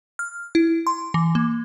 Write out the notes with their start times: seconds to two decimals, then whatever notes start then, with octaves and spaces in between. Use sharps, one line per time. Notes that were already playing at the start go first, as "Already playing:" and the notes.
0.19 F6
0.55 E4
0.87 C6
1.14 E3
1.35 A#3